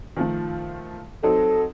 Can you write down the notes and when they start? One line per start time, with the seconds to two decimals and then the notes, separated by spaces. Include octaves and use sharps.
0.17 D#3 F3 A3
1.23 F#3 C4 D#4 A4